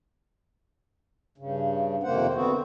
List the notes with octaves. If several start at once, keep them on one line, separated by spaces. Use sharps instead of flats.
G2 C#3
F2 C3 D#3 A#3 C5 F#5
D3 B3 C4 F#4